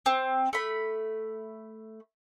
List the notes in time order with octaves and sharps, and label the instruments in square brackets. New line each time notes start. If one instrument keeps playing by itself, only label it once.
[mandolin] C4
A3 B5